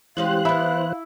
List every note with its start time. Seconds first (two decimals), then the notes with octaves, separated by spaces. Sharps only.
0.17 E3 G#3 C#4 G4 C5 F5 F#6
0.45 B3 E4 E5